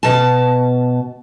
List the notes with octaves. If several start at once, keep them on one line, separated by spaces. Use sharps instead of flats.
B2 A5